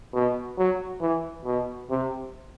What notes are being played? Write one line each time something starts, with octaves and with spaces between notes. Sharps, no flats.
B2
F#3
E3
B2
C3